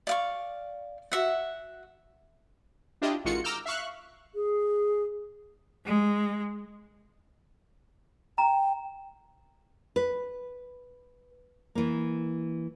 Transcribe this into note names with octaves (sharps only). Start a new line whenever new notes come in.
D5 F5 C#6
F#4 E5 F#5
D4 E4 F4 G4 D#5
A1 D#3 G#3 F4 F#4 C#7
A#5 D6 E6 F6 G6
E5 F5 C#6 F#6
G#4
G#3
G5 A#5
B4
E3 A#3